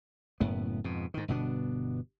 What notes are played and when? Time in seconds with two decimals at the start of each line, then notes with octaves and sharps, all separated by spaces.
0.40 F#1 F#2 A2 B3
0.84 F2 G#2 B2
1.14 G#2 D#3
1.28 G1 B2 B3 D4